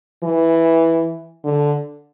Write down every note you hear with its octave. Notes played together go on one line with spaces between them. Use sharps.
E3
D3